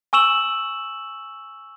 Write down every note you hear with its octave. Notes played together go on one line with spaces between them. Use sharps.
G#5 C#6 E6 E7 F#7